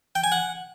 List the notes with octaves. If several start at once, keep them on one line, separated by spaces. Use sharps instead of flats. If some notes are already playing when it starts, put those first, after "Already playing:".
G5
G#5
F#5